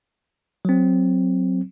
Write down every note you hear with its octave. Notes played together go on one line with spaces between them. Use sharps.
F#3 C4